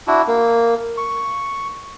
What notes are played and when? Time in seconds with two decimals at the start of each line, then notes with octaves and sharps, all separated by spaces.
0.07 D4 E4 F#4
0.27 A#3
0.98 C#6